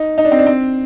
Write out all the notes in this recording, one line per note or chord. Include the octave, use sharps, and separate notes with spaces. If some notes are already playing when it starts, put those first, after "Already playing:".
Already playing: D#4
D#4
D4
C4
D4
C4